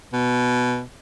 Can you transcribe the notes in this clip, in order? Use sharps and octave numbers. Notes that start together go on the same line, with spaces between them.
B2